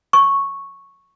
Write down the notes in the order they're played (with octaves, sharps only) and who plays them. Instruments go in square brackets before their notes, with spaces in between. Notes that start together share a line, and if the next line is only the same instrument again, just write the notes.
[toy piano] C#6